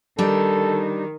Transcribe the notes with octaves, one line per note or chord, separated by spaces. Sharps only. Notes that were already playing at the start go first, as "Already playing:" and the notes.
D#3 G3 D4 D#4 A4